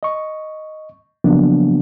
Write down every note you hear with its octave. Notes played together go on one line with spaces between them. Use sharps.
D#5 C#6
C#3 F3 F#3 A#3 B3 D4